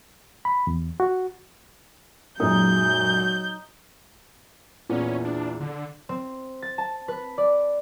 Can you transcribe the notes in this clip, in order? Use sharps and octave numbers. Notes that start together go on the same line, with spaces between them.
B5
E2
F#4
F#2 A#2 F#3 G#3 D#4 G6
E2 A#2 B3 C#4
D4
D3
C4
A6
A5
B4
D5